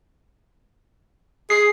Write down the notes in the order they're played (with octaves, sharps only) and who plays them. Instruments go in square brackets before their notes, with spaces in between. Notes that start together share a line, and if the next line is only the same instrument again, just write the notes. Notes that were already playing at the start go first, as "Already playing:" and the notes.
[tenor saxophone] G#4 [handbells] C7